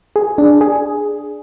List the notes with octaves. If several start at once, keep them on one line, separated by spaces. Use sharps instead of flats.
G#4
D4
G#4